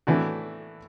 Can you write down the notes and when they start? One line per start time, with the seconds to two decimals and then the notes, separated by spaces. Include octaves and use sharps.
0.07 A2 E3 A3 D4 F#4